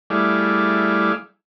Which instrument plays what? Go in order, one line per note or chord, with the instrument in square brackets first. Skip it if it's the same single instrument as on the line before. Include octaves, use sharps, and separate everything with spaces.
[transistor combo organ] G3 A3 E4 G#4 D5 F5